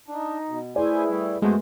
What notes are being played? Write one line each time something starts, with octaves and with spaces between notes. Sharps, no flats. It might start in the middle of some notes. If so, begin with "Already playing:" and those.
D4 D#4
B2
A3 E4 G#4 B4 C5 D5 G#5
G3 A3
F#2 G#3 A3 B3 F#4 C5